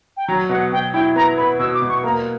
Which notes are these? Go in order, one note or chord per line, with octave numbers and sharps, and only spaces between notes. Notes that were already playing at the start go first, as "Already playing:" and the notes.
G5
F#3 A#5
B2 F#5
B2 G5
E4 G5
B3 A#5
B3 B5
B2 E6
D6
B2
C#6
A#3 A#5